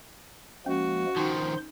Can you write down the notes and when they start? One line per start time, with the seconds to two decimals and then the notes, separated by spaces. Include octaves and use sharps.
0.66 F3 G#3 A#3 C#4 F#4
1.16 D#3 F3 D#4 C5 C6